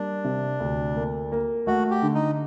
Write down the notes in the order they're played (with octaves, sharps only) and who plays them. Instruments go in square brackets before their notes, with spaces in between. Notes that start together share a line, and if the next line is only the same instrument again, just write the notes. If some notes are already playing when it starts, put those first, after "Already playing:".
Already playing: [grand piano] G3 A#3 [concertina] D4
[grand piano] C3
D2
A#3
A#3
[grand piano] A3 [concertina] F#4
[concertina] G4
[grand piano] D3
[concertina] D#4